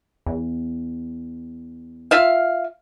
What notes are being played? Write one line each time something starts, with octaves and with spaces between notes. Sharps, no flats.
E2
F4 E5 F5